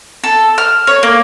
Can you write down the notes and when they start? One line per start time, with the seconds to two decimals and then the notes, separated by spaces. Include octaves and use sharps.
0.24 A4
0.58 F6
0.87 C#5
1.03 A#3